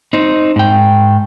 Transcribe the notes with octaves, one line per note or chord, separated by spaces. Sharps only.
C4 D#4
G#2 G5